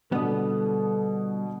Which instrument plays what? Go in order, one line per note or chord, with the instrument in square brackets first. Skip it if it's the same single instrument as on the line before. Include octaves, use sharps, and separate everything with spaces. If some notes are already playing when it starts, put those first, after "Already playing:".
[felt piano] B2 D3 D#6 [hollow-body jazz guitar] G3 B3 [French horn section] A4